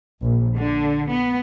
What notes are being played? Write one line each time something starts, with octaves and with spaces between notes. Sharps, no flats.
A#1
D3
B3